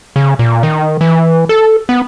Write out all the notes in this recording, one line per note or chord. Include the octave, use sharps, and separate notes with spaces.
C#3
A#2
D#3
E3
A4
B3